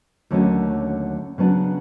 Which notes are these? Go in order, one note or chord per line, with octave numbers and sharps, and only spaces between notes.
D#2 D3 F#3 A3 C#4
C#3 F#3 B3 D4